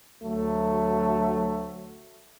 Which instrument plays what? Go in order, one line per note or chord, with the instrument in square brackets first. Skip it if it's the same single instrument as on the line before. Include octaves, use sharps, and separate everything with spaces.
[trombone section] D2 F#3 A3